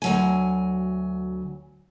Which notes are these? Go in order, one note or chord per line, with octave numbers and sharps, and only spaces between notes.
D2 F#3 G#5